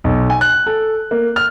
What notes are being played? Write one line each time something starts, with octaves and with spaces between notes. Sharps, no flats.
B1
G#5
F#6
A4
A#3
F6